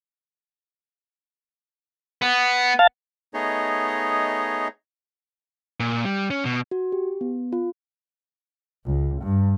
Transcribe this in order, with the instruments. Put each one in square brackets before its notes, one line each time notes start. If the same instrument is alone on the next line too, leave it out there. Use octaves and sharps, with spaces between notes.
[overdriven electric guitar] B3
[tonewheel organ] F5 A5
[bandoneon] A3 B3 D#4 G#4 C#5 D#5
[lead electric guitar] A#2
G3
C#4
B2
[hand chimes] F#4
G4
B3
F4
[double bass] C#2
G2